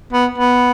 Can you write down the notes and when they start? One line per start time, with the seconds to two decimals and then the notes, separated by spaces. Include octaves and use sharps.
0.13 B3
0.38 B3